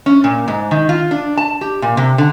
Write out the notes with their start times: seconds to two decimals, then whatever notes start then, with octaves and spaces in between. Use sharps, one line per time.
0.06 C#4
0.24 A#2
0.48 G#2
0.71 D#3
0.89 F4
1.11 D4
1.37 A5
1.61 G4
1.82 A#2
1.97 C3
2.18 D3